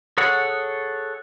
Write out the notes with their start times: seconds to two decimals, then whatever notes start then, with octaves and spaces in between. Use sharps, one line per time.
0.18 G#4 A4 C#5 F#5